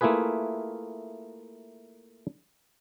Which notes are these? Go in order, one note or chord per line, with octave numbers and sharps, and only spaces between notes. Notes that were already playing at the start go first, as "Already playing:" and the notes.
A3 A#3 E4 F4 G#4 B4